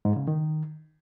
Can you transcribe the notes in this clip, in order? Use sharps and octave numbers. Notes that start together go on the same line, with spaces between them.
G#2
C#3
D#3